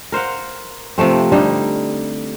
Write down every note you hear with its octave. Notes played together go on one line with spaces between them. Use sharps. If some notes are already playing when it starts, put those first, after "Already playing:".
A#4 C5 F5 F#5
C3 F3 A3 C4
D3 G3 D#4 C5